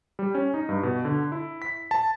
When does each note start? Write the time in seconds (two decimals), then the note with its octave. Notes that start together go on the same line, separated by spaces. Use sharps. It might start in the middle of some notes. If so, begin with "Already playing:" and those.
0.19 G3
0.35 C#4
0.54 D#4
0.69 G2
0.83 B2
1.05 D3
1.32 E4
1.62 B6
1.91 A5